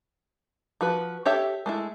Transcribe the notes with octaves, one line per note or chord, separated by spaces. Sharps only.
F3 F#4 B4
G4 A4 C#5 E5
G#3 A3 E4